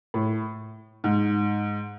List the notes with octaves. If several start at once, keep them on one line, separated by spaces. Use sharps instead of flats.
A2
G#2